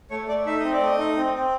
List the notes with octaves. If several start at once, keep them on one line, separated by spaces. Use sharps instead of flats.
A3 C#5
A3 D5
D#4 E5
C4 D#5
D5
A3 D#5
D#4
C4
C4